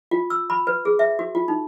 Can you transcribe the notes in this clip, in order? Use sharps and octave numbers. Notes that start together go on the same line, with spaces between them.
F4
E6
B5
B4
G#4
E5
F#4
F4
D#4